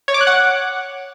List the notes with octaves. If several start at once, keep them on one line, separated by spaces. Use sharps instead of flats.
C#5
D6
F#6
F#5